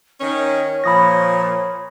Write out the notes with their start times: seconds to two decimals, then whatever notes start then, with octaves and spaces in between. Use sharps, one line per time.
0.20 D#3 C#4 C#5
0.84 A#2 F3 B5 D#6 A#6